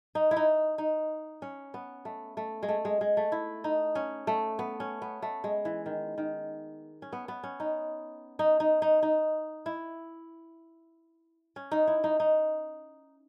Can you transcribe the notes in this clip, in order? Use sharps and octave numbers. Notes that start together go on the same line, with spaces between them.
D#4
E4
D#4
D#4
C#4
B3
A3
A3
G#3
A3
G#3
G#3
A3
E4
D#4
C#4
A3
B3
C#4
B3
A3
G#3
E3
D#3
D#3
C#4
B3
B3
C#4
D#4
D#4
D#4
D#4
D#4
E4
C#4
D#4
E4
D#4
D#4